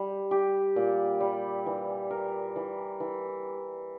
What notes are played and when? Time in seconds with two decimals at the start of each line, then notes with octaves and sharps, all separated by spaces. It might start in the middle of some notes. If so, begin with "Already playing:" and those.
Already playing: G3
0.31 G4
0.76 A#2
1.20 G3
1.66 E3
2.10 A#4
2.56 E3
3.00 E3